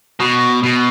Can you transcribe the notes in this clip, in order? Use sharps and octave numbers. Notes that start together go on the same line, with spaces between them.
B2
B2